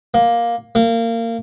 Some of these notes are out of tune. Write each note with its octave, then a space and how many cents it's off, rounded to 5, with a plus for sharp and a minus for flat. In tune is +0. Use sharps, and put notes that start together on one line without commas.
A#3 +10
A#3 -25